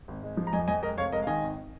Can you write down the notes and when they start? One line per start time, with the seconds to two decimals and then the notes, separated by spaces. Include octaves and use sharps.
0.08 G#1
0.23 G#3
0.37 F3
0.47 A#5
0.53 F2 D#5 G#5
0.68 F2 D#5 G#5
0.82 G#3 A#4 D#5
0.97 F1 C#5 F5
1.12 G#3 A#4 D#5
1.22 F5
1.27 D#3 D#5 G#5
1.42 G#1